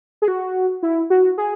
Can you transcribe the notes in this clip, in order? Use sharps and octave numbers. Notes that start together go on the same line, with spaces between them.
G#4
F#4
E4
F#4
G#4